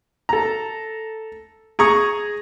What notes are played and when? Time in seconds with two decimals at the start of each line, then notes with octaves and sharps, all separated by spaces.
0.29 A4 A#5
1.79 G#4 A#5 C#6 D#6